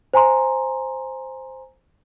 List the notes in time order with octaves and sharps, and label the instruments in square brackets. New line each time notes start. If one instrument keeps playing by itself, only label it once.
[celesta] C5 G#5 A#5 C6